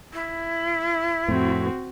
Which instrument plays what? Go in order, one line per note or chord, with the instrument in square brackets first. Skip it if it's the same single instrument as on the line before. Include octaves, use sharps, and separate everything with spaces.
[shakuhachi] E4
[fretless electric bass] F2 A2 [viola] C4 F#4